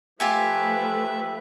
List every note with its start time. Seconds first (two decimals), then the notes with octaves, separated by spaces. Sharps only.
0.20 F3 A3 F4 G4 B4 E5 G#5